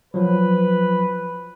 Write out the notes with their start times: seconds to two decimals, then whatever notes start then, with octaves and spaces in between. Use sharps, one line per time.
0.14 F3 F#3 B4